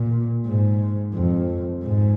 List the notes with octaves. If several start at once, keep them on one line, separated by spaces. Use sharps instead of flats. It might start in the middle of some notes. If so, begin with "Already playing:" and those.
Already playing: A#2
G#2
F2
G#2